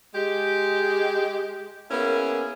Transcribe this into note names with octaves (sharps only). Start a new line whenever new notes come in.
G#3 G4
A#3 B3 C#4 E4 G#4 A#4